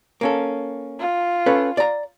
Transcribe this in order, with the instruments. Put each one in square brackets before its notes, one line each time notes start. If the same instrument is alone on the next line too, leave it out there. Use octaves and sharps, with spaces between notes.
[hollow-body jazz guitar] A#3 C#4 A4
[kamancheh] F4
[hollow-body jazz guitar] C#4 A4 B4
D5 A#5